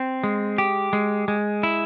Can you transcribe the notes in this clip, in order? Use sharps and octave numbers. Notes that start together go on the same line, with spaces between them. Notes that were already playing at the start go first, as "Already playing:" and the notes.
Already playing: C4
G#3
G4
G#3
G#3
E4